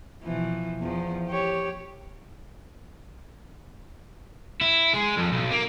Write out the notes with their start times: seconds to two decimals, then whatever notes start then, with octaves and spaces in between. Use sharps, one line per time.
0.23 B2 E3 F3
0.79 E2 F3
1.28 G4 C#5
4.61 E4
4.93 G#3
5.16 F2
5.32 B1
5.51 A#3